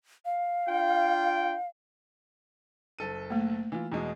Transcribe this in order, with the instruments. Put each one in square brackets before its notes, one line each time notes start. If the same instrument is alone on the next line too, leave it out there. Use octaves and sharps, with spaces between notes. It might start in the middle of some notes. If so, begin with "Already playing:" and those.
[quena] F5
[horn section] D4 F4 G5
[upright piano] F#1 A4 D#7
[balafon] A3 A#3
[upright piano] E3 F4
E2 B2 G#3